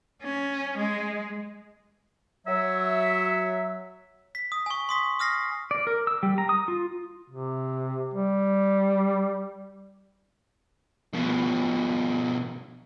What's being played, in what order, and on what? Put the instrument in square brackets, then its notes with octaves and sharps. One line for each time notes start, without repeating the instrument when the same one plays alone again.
[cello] C#4
G#3
[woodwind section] F#3 E5
[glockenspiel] B6
D#6
G#5 C#6
C6 D#6 B6
D#6 F6 A#6 C7
[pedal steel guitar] D5
A#4
E6
G3
A#5
D#6
F4
[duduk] C3
G3
[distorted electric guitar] B2 F3